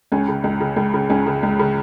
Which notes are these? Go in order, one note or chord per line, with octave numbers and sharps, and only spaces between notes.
C#2 C#4
C#3
C#2
C#3
C#2
C#3
C#2 C#4
C#3
C#2
C#3